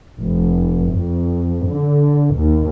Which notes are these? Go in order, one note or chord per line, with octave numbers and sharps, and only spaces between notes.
F1
F2
D3
D#2